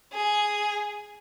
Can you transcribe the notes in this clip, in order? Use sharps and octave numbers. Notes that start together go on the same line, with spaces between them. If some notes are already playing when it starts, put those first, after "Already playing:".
G#4